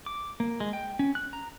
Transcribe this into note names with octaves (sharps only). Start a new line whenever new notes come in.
D6
A#3
G#3
G5
C#4
F#6
A#5